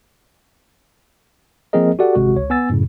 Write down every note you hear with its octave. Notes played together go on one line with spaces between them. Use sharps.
F3 A#3 C4 G#4 A#4 D#5
F#4 G4 A4 D5 F#5
G#1 C3 G#3 F#4
C#2 C#5
B3 G#5 E6 A6
F#2 A2 C#3